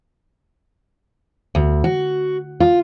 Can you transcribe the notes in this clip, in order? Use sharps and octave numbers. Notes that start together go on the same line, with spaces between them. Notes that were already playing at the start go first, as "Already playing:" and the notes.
D2
F#4
F4